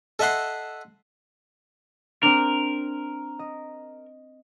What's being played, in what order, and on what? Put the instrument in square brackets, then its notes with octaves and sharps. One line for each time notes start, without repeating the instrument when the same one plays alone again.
[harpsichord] A4 D#5 E5 F#5 C6
[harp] C4 D4 [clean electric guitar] A#4
[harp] D#5